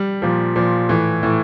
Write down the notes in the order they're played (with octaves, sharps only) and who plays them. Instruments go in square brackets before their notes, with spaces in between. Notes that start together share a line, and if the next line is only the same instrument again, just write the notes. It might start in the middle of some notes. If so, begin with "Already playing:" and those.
Already playing: [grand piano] G3
A#2 F3
A#2 F3
A2 E3
A2 E3